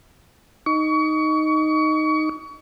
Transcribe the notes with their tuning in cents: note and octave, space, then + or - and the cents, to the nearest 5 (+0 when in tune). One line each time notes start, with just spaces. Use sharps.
D#4 +0 C#6 +30